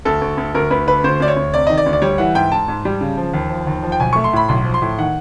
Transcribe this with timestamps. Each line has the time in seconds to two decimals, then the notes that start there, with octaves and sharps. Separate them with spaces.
0.05 D2 A4
0.21 D2
0.37 D2
0.55 D2 A#4
0.71 D2 B4
0.87 D3 B4
1.04 D2 C5
1.20 D2 D5
1.28 C#5
1.37 D2
1.53 C3 D5
1.67 D#3 D#5
1.78 D5
1.86 D2
1.93 D5
2.02 G3 C#5
2.18 E3 F#5
2.35 G#2 G5
2.52 G#2 A5
2.68 G#2
2.85 G3
3.01 C#3
3.17 F3
3.34 D#2
3.50 F3
3.67 D#2
3.83 F3
3.92 G5
4.00 B1 G#5
4.13 A3 C#6
4.24 C6
4.33 A2 B5
4.48 B1 C6
4.65 F3
4.74 C6
4.82 A2
4.98 D#3 F#5